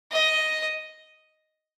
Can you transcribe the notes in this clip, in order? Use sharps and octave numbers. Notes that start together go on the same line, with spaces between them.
D#5